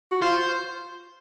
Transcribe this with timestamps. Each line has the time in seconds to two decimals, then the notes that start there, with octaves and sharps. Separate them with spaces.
0.12 F#4
0.22 F4 C5